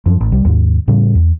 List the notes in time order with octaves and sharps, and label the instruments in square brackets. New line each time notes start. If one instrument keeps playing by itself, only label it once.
[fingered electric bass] F#2 F3
A1
C2 G3
D#2 G#2
A2 C#3 G3
E2